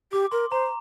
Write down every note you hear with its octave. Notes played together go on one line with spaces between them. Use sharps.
G4 D6
A#4 C6
C5 A#5